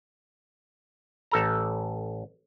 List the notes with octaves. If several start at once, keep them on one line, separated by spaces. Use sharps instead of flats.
A1 A4 A#5